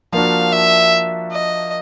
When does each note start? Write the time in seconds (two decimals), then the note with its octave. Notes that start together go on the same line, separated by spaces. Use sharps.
0.13 F3 A#3 D4 F#4 F5
0.52 E5
1.31 D#5